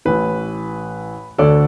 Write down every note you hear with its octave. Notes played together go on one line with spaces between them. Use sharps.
A1 A2 E3 B4
D2 D3 A4 D5